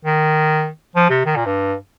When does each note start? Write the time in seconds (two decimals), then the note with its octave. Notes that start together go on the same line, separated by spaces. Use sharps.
0.05 D#3
0.96 F3
1.10 C3
1.26 D#3
1.36 A#2
1.46 G2